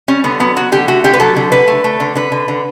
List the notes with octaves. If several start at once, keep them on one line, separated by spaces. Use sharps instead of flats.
G3 C#4
D3 B3
F#3 B3
F#3 F#4
D3 G4
A3 F#4
D3 G4
B4
F#3 A4
D3
D3 B4
A3
A3
D3
D3 B4
D3
D3